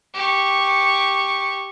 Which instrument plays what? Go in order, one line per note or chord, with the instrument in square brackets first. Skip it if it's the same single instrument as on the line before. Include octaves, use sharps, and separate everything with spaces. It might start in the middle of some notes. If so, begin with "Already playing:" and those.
[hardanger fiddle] G4 C#6